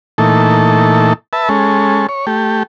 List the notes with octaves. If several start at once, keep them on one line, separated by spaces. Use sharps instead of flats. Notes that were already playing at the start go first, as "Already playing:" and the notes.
A#2 E3 A3 D#4 A4
B4 E5 A5
G#3 C#4 A4
C#5
A3 G4